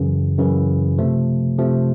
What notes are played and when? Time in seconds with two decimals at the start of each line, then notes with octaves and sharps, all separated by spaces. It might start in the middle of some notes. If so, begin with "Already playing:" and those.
Already playing: F#2 C#3 E3
0.38 F#2 C#3 E3
0.98 C3 F3 A3
1.58 C3 F3 A3